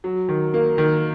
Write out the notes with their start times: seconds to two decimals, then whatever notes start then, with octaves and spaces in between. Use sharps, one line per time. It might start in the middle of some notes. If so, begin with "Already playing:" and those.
0.04 F#3
0.29 D#3
0.54 A#3
0.78 D#3